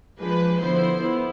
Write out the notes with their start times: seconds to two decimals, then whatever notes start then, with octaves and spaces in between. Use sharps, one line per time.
0.20 F3 G#3 D4 B4
0.61 D3 F3 B3 E4 C5
1.02 B3 E4